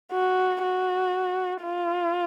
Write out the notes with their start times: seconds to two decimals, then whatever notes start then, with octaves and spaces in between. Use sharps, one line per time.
0.12 F#4
0.63 F#4
1.64 F4